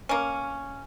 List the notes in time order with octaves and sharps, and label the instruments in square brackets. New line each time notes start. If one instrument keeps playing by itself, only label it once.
[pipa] A#3 C#4